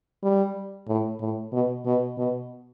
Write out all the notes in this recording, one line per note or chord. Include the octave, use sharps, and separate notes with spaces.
G3
A2
A2
B2
B2
B2